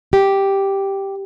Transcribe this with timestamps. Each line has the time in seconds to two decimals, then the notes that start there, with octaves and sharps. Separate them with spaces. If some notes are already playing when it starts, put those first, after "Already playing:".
0.13 G4